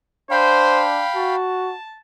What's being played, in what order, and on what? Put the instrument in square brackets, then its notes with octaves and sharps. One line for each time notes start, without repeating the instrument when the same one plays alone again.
[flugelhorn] D4 [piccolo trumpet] C5 [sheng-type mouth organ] F5 G5 B5
[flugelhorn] F#4 [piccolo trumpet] A5